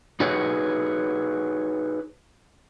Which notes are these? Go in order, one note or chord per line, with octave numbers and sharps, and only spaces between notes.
D#4 F#4 G#4 B4 C#5